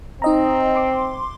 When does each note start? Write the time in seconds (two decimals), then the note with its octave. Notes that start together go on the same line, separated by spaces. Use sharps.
0.22 C4 D#4 D#5 A#5
0.75 C6 D6